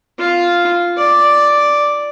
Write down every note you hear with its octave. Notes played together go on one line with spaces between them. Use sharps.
F4
D5